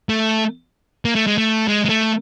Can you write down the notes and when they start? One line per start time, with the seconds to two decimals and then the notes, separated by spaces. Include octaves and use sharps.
0.09 A3
1.05 A#3
1.15 A3
1.27 G#3
1.38 A3
1.68 G#3
1.85 G#3
1.89 A3